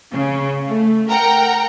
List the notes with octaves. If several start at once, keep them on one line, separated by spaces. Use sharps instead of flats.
C#3
A3
A#4 F#5 G5 A#5